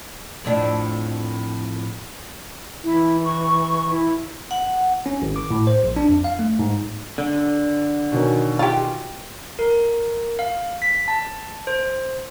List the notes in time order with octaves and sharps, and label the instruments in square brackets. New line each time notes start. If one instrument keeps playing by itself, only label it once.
[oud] F2 A2 D4
[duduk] E3 [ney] E4
[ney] C#6
E4
[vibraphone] F#5
[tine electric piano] C#4
G#1
D6
A2
C5
A#1
D4
F2
F5
A3
G#2
[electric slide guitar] D3
[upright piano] B2 D#3 C#4
[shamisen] F4 G4
[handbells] A#4
F5
B6
A5
C5